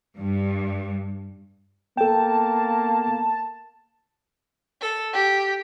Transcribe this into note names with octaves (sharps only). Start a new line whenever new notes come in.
G2
A#3 B3 A4 G5 A5
A4
G4